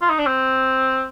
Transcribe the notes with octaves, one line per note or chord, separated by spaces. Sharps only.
F4
D#4
D4
C4